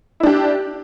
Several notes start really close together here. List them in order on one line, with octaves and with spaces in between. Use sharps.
E4 D4 G4